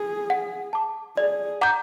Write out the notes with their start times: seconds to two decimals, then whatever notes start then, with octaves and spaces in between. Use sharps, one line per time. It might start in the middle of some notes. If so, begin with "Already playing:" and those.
Already playing: G#4
0.30 F#5
0.73 A5 D6
1.17 G#4 D5
1.61 F#5 A#5 D6 G6